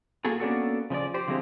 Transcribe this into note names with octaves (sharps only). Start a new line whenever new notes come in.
A#3 F#4 G#4 A4
A#3 B3 C#4 D4 F#4 A4
C#3 F3 D4 D5
G4 C5
D3 F3 G#3 C4 E4 G4